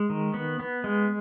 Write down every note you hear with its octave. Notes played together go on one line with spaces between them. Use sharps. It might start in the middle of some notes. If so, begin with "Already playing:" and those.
Already playing: G#3
D#3
B3
B3
G#3